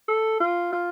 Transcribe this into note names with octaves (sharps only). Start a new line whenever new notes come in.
A4
F4
F4